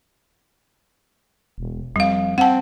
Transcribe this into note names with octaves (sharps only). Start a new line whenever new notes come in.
E1
F2 G3 F5
C4 F#5 A5